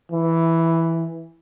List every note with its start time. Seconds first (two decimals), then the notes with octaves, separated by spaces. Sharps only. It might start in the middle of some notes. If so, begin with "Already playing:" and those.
0.12 E3